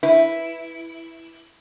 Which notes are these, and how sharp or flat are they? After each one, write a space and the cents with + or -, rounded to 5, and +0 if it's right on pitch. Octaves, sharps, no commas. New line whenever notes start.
E4 +0 B4 +0